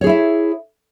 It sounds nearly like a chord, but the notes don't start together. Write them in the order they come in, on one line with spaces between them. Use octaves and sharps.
C#5 G#4 E4 E5